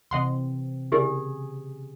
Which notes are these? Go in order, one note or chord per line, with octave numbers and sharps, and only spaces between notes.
C3 E3 C4 D#5 F#5 C6
C#3 E4 G4 G#4 A#4 D5